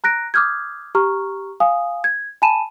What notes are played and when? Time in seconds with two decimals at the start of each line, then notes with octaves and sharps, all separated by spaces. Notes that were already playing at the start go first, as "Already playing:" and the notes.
0.04 A#5 F#6 A#6 D7
0.34 D6 D#6 F6 G6 G#6
0.95 G4 A#5 C#6 F6
1.60 F5 G#5 D#6
2.04 G#6
2.42 G#5 A5 B5 D#7 E7